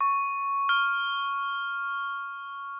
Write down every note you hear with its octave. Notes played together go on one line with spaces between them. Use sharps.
C#6
F6